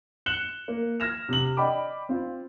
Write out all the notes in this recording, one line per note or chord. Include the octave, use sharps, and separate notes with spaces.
F#6 C#7 E7 F#7 G7
A#3
F6 G#6 A#6 E7 F7
C3 F#7
D5 D#5 G5 B5 D6
C4 F4